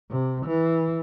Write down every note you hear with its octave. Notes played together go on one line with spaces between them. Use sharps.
C3
E3